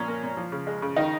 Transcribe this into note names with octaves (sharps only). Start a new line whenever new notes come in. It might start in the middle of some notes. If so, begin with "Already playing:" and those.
Already playing: A#2 F3 C#4
A#3
A#2
F3
C#3
G#3
C#3
D#3 D#4